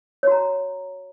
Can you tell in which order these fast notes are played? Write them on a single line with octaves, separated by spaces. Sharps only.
C#5 F#4 A#5